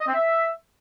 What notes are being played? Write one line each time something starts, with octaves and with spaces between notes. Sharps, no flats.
D#5
C4
E5